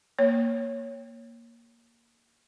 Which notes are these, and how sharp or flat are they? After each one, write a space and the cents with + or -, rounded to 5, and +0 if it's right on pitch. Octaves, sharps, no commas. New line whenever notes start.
A#3 +0 C#5 +0